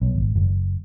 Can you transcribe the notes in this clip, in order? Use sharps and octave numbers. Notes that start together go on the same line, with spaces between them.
B1
G#1
F#1